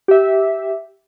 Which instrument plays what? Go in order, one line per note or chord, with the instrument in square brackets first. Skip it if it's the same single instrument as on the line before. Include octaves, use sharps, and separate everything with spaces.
[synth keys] G4 E5